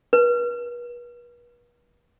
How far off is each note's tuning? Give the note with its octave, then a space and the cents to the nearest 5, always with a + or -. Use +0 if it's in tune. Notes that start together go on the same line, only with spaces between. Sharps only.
B4 -40